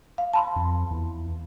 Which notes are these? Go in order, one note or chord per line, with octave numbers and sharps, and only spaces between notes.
F5
A5 B5 C6
F2
E2